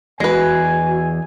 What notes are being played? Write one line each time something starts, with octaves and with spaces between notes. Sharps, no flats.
E2 G#3 F#4 B4 G#5